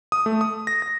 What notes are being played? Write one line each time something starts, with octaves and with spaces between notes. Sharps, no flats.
D#6
A3
D#6
A#6
A#6